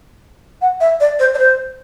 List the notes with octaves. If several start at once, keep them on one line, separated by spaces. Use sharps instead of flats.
F#5
E5
D5
C5
D5
C5